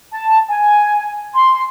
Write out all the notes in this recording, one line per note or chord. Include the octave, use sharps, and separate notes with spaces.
A5
G#5
C6